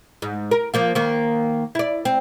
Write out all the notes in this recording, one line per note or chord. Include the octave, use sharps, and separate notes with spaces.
G#2
A#4
F3 A#3 F4
D#3 A#3
E4 D5
C4